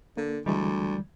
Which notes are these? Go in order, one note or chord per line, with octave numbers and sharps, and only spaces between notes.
D3 A#3
D2 D3 E3 G3 G#3